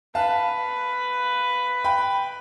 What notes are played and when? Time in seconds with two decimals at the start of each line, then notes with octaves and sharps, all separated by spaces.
0.15 B4 F5 A5
1.84 G5 B5